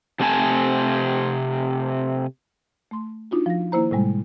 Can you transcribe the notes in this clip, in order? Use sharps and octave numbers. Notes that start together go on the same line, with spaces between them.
C3 A3 C4 C5 G#5 A5
A3 C6
D4 D#4 F4 F#4
F3 A#6
D#3 A#3 E4 C5 A#5
A2 C3 G3 G#3